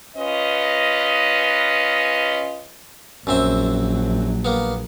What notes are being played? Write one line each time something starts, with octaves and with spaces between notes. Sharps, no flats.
C#4 F4 B4 D#5
A#1 F#2 F#3 C4 E5
A#3 B3